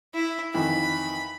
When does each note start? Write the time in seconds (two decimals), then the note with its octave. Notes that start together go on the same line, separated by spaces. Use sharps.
0.14 E4
0.54 F2 D#3 E3 B5